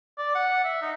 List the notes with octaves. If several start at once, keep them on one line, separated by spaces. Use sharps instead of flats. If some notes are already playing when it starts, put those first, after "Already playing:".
D5
F#5
E5
D#4